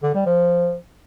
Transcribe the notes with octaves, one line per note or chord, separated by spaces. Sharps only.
D3
G3
F3